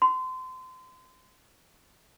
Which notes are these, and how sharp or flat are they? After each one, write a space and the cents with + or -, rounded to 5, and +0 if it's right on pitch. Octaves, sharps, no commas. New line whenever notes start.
C6 -30